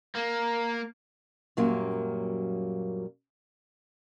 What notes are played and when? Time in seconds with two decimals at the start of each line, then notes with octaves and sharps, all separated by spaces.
0.16 A#3
1.57 F#2 A#2 F#3 G3 A#3 C#4